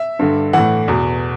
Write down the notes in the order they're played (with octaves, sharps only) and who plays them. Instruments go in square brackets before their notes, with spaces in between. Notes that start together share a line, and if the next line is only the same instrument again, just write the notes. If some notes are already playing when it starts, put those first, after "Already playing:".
Already playing: [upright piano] E5
G2 D3
A2 E3 F#5
E2 B2